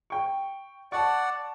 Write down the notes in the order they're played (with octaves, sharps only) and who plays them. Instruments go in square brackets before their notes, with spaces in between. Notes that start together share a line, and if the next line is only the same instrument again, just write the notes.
[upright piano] G5 C#6
[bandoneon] D5 F#5 [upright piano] A5 C#6